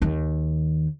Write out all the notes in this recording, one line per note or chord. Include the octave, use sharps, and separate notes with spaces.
D#2 D#3